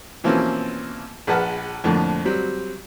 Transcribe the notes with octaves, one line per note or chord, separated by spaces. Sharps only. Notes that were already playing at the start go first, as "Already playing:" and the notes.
B2 E3 F3 A#3 C4 C#4
A#1 G#4 B4 F#5 A5 F6
F2 A2 D3 F3 A#3
F#3 G3 C4